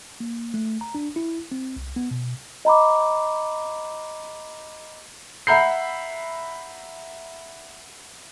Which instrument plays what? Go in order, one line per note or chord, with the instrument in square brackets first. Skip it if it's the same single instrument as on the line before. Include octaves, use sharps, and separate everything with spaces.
[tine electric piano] A#3
A3
A#5
D4
E4
C4
C2
B3
B2
[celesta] D#5 A#5 B5 D6
[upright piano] E5 F#5 A#5 B5 G6 C7